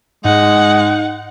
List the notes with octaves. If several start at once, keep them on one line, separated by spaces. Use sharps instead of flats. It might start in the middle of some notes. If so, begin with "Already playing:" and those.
G#2 G#3 D#4 F#5